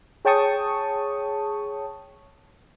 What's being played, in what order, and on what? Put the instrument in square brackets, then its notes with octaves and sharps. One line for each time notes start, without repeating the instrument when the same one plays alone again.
[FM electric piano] G#4 C#5 G5 A5 C#6 D#6